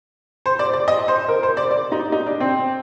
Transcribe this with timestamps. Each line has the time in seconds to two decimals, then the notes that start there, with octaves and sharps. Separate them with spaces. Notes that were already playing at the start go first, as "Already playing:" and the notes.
0.46 C5
0.59 D5
0.73 D5
0.88 D#5
1.08 C5
1.28 A#4
1.43 C5
1.57 D5
1.71 D5
1.92 D#4
2.12 D#4
2.27 D4
2.40 C4